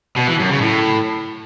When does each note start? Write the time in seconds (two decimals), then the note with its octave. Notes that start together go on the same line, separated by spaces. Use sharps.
0.16 B2
0.28 E3
0.39 F#2
0.50 C#3
0.61 A2